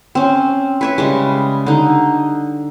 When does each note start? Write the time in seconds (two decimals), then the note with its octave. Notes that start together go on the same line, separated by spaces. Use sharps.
0.15 C4 C#4
0.81 B4 C#5 E5
0.98 C#3 G3 G#3
1.66 D3 D#4